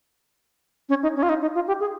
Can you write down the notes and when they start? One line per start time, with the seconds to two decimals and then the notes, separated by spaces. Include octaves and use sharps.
0.89 C#4
1.03 D#4
1.16 C#4
1.23 F4
1.29 D#4
1.41 D#4
1.55 F4
1.68 G4
1.80 G#4